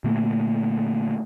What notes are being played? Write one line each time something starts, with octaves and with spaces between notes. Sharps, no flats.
A#2 D3 A3 A#3